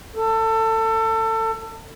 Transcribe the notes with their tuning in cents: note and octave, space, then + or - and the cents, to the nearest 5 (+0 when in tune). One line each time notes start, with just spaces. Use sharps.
A4 +25